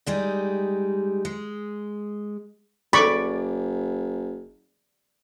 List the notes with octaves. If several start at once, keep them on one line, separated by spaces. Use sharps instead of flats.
G3 G#3 D#4
G#3
F#1 D5 B5 C#6 D6